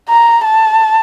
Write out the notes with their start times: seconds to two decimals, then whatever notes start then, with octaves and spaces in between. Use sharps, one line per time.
0.09 A#5
0.45 A5